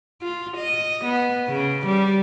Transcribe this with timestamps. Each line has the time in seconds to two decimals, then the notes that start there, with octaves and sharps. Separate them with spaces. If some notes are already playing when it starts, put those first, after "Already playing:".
0.22 F4
0.57 D#5
1.05 B3
1.48 C#3
1.86 G3